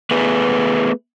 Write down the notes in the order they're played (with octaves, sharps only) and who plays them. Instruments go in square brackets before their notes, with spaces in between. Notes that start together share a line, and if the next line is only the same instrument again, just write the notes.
[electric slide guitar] A3 B3 G#4 B4